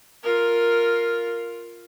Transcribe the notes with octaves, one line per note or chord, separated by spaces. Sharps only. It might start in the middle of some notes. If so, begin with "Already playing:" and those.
F4 A#4